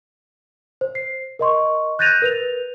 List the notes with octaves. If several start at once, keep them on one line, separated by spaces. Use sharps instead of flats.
C5
C7
A#4 D#5 C6 C#6
F#6 G6 A6 A#6 D#7 F7
A#4 B4 F7